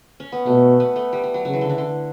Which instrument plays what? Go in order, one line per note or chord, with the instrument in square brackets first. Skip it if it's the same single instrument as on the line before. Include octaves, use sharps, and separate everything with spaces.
[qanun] C#4
B3
[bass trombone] B2 [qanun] A3
[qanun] B3
A3
G3
G3
F#3
[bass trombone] C#3 [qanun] F#3
[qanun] E3
D3
E3
D3